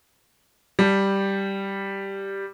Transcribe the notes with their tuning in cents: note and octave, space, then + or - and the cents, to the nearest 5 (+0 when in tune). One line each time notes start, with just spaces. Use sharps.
G3 +0 G4 +0 A5 +5